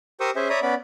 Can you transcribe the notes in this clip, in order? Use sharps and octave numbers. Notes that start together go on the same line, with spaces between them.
G4 A#4 C5 C#6 D#6 E6
C#4 G#4 C5 E5
C#5 D5 E5 A#5 B5 D#6
B3 C#4 D5 B5